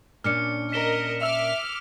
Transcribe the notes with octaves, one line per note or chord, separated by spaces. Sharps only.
A#2 C#4 D4 F6 C#7
A#4 D#5 B6 E7 G7
E5 D6 E6 F6 F7